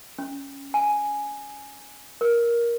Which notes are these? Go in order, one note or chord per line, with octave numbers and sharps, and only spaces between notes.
C#4
G#5
A#4